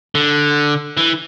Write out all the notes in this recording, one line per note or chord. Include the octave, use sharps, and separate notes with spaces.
D3
E3